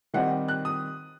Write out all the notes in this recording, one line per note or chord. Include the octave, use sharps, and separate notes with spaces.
D#3 G3 C4 D#4 F#5
F#6
D#6